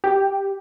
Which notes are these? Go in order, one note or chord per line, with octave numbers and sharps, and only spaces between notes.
G4